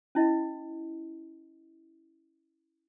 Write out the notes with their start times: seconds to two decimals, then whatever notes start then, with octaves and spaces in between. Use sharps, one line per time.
0.15 C#4 E4 D#5